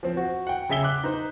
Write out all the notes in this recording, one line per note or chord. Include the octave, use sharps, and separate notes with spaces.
F3 C4
F#4
F#5 G5
C#3 G#4 E5 B6 G7
D6 F#6
D#4 C5